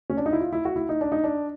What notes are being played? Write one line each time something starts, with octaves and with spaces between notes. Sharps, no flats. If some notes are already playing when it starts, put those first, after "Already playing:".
C#4
D4
D#4
E4
F4
E4
F#4
E4
D#4
D4
D#4
D4